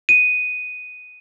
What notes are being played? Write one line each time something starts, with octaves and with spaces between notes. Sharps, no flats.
D#7